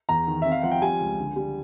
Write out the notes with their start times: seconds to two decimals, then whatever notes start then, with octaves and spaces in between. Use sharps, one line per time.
0.09 E2 A#5
0.27 D#3
0.42 C4 E5
0.52 F5
0.62 F3 F#5
0.71 G5
0.82 G3 G#5
1.00 C#2
1.18 D3
1.36 G3